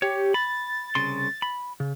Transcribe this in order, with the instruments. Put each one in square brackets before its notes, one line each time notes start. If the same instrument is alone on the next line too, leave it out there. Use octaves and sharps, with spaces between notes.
[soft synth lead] G4 [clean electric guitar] C#5
[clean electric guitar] B5 [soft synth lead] A6
[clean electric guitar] C2 C#3 C6
B5
C#3